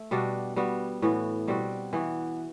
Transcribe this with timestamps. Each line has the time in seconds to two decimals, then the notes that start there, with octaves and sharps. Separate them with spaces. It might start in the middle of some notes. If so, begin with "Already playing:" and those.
Already playing: A3
0.11 B2 G3 D4 F#4
0.56 G3 B3 F#4
1.02 A2 E3 B3 F#4
1.48 B2 G3 C4 F#4
1.93 E3 B3 F#4